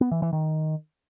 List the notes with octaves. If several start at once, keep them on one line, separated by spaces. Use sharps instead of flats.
B3
E3
E3
D#3